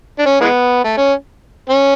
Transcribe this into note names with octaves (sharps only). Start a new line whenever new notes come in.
D4
C#4
E3 G#3 B3
A3
C#4
C#4